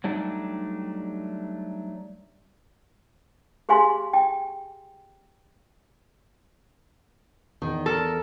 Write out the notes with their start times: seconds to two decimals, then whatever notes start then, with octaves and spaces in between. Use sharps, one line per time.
0.04 F#3 G3 A3 D4 D#4
3.69 G4 G#4 F5 G#5 C6
4.13 G5
7.62 E2 D#3
7.86 A4 A#4